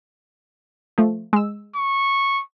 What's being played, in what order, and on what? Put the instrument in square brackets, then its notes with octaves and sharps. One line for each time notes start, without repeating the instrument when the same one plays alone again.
[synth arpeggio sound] F3 A3
G#3 E6
[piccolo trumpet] C#6